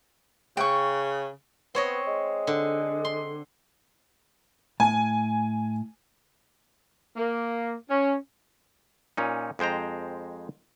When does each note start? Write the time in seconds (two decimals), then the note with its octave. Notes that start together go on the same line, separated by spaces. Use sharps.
0.57 C#3 G5 C#6
1.75 B3 C4 C#5 D#5
2.07 G#3
2.47 D3
3.05 C6
4.80 A2 G#5 A5
7.17 A#3
7.90 C#4
9.17 A#2 C#4 D#4
9.59 F2 G#3 C5 G5 A#5